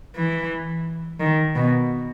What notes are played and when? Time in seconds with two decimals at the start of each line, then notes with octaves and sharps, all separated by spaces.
0.16 E3
1.20 D#3
1.55 B2